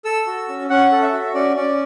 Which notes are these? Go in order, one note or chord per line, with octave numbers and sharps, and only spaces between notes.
A4 E6
F#4
C#4
C#4 F#5
A4
E5
F#4
C#4 D5
C#4 D5